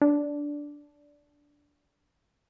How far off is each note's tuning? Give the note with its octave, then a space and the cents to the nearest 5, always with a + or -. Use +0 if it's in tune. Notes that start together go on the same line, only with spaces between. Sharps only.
D4 -10